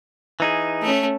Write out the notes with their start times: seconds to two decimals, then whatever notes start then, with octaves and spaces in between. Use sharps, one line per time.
0.40 E3 D#4 G#4
0.83 A3 C#4